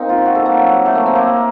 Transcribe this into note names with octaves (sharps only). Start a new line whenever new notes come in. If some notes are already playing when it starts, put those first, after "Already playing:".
Already playing: A#3 C4 D#4
F4
F#4
A4
A#3
F#3
A3
A#3
C4
A#3